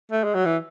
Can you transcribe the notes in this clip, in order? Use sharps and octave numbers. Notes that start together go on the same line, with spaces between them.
A3
G#3
F#3
E3